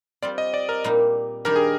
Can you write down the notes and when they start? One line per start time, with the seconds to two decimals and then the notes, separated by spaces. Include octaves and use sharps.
0.22 G3 C4 F4 D5
0.38 D#5
0.54 D5
0.69 A#4
0.84 A#2 G3 A#3 D#4
1.45 D#3 G3 D4 G4 A#4
1.56 G#4